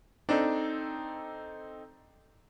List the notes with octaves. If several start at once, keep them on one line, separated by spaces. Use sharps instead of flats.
C4 D4 D#4 A4